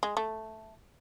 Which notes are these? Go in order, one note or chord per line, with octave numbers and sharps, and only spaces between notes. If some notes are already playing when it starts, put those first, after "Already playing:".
G#3
A3